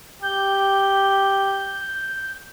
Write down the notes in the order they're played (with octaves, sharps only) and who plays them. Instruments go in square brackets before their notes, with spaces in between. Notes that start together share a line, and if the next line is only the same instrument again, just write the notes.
[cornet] G4 [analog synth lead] G6